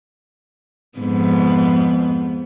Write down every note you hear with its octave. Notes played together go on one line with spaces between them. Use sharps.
F2 G#2 B3